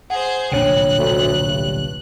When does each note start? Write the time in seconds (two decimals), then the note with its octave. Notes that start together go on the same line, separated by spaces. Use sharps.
0.10 G#4 C5 F#5
0.52 D1 A#1 C3 D4 C#5 G5 F#6
0.98 D2
1.46 G2